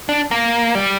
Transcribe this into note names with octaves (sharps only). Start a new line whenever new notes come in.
D4
A#3
G3